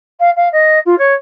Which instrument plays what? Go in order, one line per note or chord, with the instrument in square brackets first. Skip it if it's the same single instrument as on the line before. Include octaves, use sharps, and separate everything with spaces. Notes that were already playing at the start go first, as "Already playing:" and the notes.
[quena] F5
F5
D#5
F4
C#5